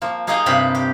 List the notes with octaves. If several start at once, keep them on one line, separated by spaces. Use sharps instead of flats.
F3 A#3
A#3 D#4 G#4 D#5 F5 G5
G2 C3 A#3 F4 G5 B5
G4